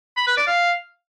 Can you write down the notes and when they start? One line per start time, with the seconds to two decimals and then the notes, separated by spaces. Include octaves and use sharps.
0.17 B5
0.27 B4
0.37 D5
0.47 F5